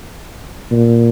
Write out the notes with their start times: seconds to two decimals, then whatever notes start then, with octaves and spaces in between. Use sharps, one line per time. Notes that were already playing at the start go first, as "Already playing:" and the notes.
0.71 A#2